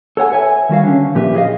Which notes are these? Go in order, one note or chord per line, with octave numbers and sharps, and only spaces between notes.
A4 C#5 F#5 G#5
A4 B4 C#5 E5 G#5
D#3 G3 F#4 F5
D3 C#4
A#2 F3 G4 B4 E5
E4 F#4 G#4 C#5 D#5 F5